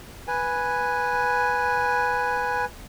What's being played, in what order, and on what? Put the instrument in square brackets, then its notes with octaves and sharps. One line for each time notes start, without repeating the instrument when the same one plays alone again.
[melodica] B4 G#5